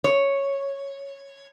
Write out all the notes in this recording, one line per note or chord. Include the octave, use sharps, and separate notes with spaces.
C#5